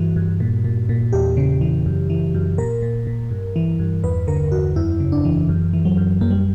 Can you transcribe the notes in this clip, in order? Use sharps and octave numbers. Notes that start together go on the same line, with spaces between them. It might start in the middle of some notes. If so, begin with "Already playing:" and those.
Already playing: G2 E3 F#4
G2
A#2
A#2
A#2
E2 G4
C#3
E3
F#2
E3
F#2
A#2 A#4
A#2
A#2
G2
E3
G2
E2 B4
D3 A#4
E2 F#4
F#2 E4
C#3
D4
E3
F#2
E3
F#3
F#2
F#2 A#3
G3